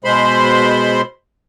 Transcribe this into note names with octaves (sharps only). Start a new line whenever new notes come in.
B2 G#3 C5 B5 C6